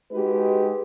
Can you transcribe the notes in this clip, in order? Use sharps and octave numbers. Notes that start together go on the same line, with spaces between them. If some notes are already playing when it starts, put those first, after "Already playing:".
G#3 D#4 F#4 G4 B4